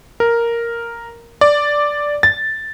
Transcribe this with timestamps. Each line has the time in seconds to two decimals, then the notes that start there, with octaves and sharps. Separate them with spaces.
0.20 A#4
1.41 D5
2.23 A6